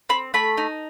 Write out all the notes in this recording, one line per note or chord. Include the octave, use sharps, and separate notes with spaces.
C4 B5
A3 B5
D#4